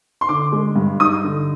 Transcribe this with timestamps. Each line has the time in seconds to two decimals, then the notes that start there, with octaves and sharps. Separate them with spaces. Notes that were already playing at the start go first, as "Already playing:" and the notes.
0.21 C6
0.29 D3 D6
0.52 G#3
0.76 G2
1.00 D#4 D#6
1.24 D3